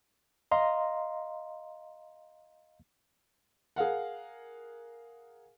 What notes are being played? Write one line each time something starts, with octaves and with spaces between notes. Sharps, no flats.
D#5 F5 A#5 C6
G#4 A#4 F5 F#5